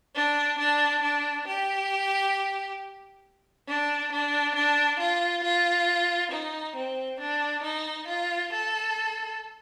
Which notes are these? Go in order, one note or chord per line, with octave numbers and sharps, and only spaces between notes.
D4
D4
D4
G4
D4
D4
D4
F4
F4
D#4
C4
D4
D#4
F4
A4